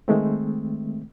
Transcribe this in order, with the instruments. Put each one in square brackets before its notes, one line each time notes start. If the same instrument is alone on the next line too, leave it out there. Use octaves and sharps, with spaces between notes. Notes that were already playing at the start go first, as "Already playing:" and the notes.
[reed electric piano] D#3 G#3 A3 C4